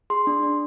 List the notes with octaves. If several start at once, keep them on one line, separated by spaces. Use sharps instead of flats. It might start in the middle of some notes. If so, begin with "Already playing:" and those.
G#4 C6
D4
D4